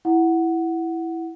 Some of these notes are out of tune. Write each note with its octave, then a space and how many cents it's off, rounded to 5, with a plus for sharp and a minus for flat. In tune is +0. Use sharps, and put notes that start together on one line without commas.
E4 +0 F#5 +0